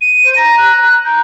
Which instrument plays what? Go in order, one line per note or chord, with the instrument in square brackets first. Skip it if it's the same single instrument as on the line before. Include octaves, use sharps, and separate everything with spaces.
[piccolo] D#7
[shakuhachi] C5
[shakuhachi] A#5 [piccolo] A#6
[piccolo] F#6
[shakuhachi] A#5 [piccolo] G6